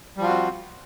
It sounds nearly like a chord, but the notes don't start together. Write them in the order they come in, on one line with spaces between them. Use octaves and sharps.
G3 F3 F4 F#4 C4